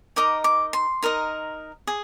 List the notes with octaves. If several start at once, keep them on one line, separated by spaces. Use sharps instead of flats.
D#4 A#4 D#5 D6
D6
C6
D#4 A#4 D#5
G#4